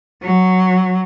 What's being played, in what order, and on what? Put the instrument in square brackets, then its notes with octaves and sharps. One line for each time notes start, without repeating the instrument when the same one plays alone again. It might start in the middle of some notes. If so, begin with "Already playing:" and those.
[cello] F#3